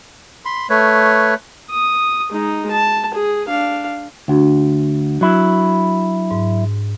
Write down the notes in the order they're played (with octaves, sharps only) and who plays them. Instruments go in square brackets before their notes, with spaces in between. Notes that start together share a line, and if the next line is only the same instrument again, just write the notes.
[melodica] B5 C6
A3 B4 C#5
[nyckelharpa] D#6
G#3 D#4
A5
G#4
D4 F5
[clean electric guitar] D2 [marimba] D4 F#4
[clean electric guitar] F#3 E4
[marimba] G#2